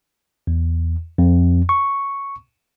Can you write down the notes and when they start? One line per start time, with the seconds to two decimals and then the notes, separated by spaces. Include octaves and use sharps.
0.47 E2
1.18 F2
1.69 C#6